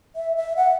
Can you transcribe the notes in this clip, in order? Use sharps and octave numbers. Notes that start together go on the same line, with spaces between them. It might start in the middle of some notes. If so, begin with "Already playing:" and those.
E5
E5
F#5